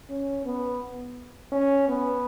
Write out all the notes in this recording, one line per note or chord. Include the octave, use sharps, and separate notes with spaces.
C#4
B3
C#4
B3